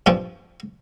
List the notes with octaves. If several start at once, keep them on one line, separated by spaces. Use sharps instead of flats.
G2 F3 C4